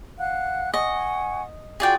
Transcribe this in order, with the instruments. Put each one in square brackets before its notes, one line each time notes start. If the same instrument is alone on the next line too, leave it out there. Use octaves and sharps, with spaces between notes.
[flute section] F5 F#5 F#6
[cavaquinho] D#5 [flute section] F#5 G#5 C#6
[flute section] F4 F#4 [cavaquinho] G#4 D5 G5